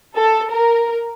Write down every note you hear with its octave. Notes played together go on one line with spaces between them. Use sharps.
A4
A#4